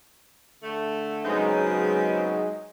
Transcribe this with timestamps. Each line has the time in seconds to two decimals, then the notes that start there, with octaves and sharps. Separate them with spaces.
0.63 D3 A3
1.24 C#3 F#3 G#3 B3 C4 D#4